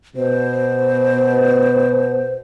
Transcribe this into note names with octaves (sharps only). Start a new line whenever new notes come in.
B2 C5